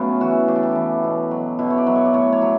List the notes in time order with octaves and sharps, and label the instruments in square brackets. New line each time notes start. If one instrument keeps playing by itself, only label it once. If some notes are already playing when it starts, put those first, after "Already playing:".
Already playing: [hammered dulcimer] C#3 F#3 A3 B3 C#4
E3 F#4
C#3 G4
A4
G4
E3
B2
F#3
B2 E4
C#5
D5
F#3
C#5
D5
A2 C#5
C#5
F#3